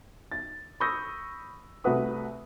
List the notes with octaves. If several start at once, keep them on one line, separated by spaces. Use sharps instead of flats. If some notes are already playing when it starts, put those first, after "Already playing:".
A6
B5 C#6 D#6 E6 G6 A#6
C2 A3 F#4 B4 D#6